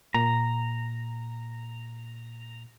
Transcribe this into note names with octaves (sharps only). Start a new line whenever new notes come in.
A#2 A#5